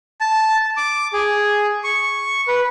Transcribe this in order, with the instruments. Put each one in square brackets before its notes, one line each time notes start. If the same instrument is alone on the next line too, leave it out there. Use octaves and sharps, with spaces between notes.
[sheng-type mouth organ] A5
D6
G#4
C#6
B4